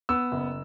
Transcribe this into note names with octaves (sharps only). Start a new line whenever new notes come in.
B3 E6
F#1